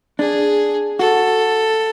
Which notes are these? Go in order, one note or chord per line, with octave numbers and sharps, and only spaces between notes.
D4 G#4
F#4 A4